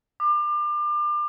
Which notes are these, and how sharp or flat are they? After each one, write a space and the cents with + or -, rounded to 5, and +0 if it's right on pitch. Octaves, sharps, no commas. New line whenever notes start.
D6 +35